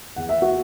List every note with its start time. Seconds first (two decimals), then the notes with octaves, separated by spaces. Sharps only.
0.16 E2 F#5
0.29 E5
0.42 F#4 F#5